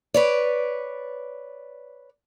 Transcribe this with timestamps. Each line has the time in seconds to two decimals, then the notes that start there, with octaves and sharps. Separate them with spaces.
0.14 B4 C#5 D5